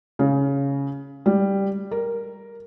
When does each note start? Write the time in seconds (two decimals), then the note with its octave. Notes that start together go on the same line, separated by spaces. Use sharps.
0.19 C#3
1.26 G3
1.91 A#4